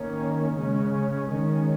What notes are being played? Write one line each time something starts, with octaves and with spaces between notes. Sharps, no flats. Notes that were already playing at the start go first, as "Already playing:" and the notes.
Already playing: D#3 A#3 C#4
C#3 G#3 C#4
D#3 G#3 C#4